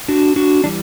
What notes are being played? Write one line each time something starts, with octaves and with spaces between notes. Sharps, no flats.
D4 F#4
D4 F#4
E3 G3 D4